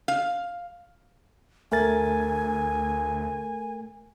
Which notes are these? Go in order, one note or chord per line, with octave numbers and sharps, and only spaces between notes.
F5
D2 A3 A#4 G#5 A6